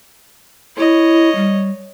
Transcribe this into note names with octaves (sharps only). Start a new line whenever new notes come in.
E4 C#5 D#5
G3